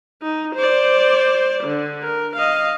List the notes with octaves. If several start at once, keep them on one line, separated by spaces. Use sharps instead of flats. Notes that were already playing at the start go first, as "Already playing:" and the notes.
D#4
C5 D5
D3
A#4
D#5 F5